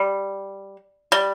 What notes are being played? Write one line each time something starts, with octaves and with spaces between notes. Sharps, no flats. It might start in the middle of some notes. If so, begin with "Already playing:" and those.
Already playing: G3
G3